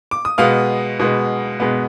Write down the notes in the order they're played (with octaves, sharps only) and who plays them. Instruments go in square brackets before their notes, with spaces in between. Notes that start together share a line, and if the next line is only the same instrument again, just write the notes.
[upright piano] D6
D#6
B2 G#3 B3 F5 F6
B2 G#3 B3
B2 G#3 B3